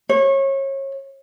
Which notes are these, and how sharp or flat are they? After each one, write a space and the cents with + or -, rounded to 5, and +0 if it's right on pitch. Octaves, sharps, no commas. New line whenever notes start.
C#5 -30